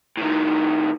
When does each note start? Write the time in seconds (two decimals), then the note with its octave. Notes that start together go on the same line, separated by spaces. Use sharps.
0.17 A2 D#3